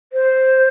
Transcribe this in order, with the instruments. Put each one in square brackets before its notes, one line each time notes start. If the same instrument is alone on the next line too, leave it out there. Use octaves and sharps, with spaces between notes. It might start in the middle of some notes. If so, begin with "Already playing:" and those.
[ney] C5